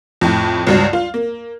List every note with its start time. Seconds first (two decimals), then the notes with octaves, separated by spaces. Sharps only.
0.21 F2 A2
0.67 C#2 G2 F#3
0.93 F4
1.14 A#3